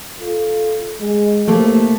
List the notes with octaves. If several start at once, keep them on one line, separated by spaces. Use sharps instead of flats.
F4 A4
G#3
D#2 A2 C3 A3 A#3